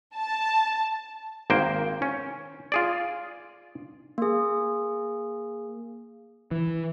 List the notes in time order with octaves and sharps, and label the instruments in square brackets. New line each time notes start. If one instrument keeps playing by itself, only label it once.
[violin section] A5
[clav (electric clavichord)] G#1 A#3 C5 G5
C#4
F4 G#4 D5
[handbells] A#3 G#4
[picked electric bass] E3